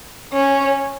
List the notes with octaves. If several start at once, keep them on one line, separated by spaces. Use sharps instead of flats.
C#4